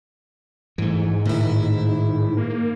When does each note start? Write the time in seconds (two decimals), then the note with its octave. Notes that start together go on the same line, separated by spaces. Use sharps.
0.78 G#2 E3 A3
1.26 A2 D#3 E4
2.37 A#3